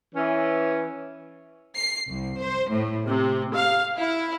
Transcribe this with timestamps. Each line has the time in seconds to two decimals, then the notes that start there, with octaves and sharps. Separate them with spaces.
0.15 E3 C#4
1.76 C7
2.11 C2
2.40 C5
2.72 A2
3.08 C3
3.54 F5
3.98 E4